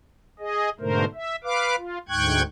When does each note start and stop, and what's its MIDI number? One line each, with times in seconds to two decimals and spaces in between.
0.39 0.69 68
0.39 0.69 75
0.80 1.05 44
0.80 1.05 47
0.80 1.05 50
0.80 1.05 57
0.80 1.05 70
0.80 1.05 72
1.14 1.36 76
1.44 1.76 71
1.44 1.76 77
1.44 1.76 86
1.77 1.98 65
2.09 2.42 38
2.09 2.42 44
2.09 2.42 79
2.09 2.42 85
2.09 2.42 90
2.09 2.42 92